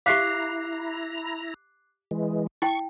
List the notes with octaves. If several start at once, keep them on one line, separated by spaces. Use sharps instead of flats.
E4 G4 E5 F5 A#5 D6 F#6 C7
E3 G#3
E4 G5 C#6